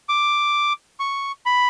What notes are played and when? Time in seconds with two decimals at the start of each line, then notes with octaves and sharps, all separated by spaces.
0.09 D6
1.00 C#6
1.46 B5